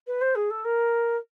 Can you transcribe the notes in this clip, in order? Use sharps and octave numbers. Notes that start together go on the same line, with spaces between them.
B4
C5
G#4
A4
A#4